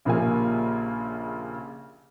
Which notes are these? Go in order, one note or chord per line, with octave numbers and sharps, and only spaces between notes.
A#1 C#3 F3 A#3 G4 G#5